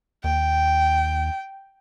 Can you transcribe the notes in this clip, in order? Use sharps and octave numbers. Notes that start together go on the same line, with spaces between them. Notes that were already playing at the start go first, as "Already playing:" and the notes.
D#2 G5